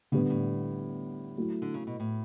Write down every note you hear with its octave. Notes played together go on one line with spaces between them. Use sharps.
A2 D3 G3 B3
A2
F#3 A3 E4
D3
C#3
B2
A2